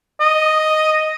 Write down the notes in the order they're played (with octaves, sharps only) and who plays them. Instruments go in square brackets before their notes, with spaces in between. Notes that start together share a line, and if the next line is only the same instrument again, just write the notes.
[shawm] D#5